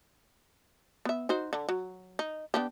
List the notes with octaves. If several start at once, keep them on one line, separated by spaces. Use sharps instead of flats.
B3 E5
D#4 F#4 C5
D3
F#3
D#4
B3 D4 G4